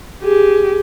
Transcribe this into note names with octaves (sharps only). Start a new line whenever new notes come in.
G4 G#4